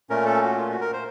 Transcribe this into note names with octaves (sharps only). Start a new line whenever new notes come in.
A#2 A3 C#4 A#4
A4
F#4
F4
F#4
A#4
C5